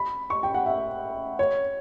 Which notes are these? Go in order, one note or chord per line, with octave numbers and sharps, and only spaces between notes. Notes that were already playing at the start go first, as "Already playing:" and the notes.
Already playing: B5
C#6
G5
F#5
E5
C#5